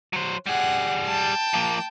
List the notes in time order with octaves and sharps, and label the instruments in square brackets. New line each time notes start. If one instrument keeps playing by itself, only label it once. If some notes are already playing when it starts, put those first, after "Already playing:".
[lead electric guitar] F#3 C5
[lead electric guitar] G3 G#4 [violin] F#5
[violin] G5 A5
[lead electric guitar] F3 A#3